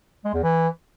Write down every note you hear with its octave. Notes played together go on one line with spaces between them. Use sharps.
G#3
E2
E3